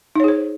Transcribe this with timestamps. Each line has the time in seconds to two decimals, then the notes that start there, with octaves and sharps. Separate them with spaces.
0.15 D#4
0.20 C#5
0.24 G#4
0.28 C5